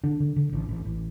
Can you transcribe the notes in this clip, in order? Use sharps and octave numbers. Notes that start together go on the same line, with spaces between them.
D3 D4
D3
D3
A1
A1
A1